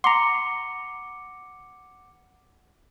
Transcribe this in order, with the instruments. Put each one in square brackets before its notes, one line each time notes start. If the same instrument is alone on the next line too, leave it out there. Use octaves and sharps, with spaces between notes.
[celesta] F#5 D6 C#7 [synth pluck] A#5 C6